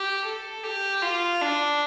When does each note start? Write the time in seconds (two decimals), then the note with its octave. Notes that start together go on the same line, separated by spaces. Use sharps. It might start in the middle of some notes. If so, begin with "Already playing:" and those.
Already playing: G4
0.25 A4
0.64 G4
1.02 F4
1.41 D4